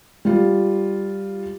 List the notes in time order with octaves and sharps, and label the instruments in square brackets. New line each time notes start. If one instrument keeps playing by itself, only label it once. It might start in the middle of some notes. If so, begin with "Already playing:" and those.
[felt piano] G3 F4